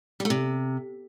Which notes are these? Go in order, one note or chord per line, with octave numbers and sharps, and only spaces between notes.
G3
A3
C3